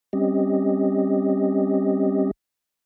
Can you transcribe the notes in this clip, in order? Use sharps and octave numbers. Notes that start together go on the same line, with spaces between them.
G3 C4 C#4 G4 D#5